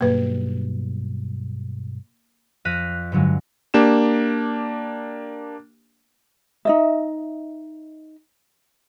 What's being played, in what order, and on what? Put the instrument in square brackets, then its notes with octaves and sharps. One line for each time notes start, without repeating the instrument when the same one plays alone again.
[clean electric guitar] B1 G2 [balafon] A#3 B4
[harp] F2 F5 F#6 A#6 B6 D#7
G2 D3 F#3 G#3
[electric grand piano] A#3 D4 G4 E7
[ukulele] D#4 D#5 E5